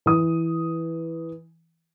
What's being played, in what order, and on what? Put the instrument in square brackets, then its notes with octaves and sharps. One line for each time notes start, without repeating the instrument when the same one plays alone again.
[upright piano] E3 D#6